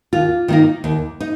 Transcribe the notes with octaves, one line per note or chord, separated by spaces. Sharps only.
D#2 F4
D#3 A#3 D#4
D#2
D#4